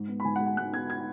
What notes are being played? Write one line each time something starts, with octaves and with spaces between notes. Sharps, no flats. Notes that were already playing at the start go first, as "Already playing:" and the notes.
Already playing: G#2
B3
B5
G#2 G#5
F#5
G#3
F#5
G#2 F#6
B3 G#6
G#6